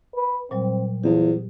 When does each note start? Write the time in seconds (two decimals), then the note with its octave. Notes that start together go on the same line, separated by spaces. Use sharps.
0.15 B4
0.51 A#2 F#3 G3 C4
1.04 E2 F3 G4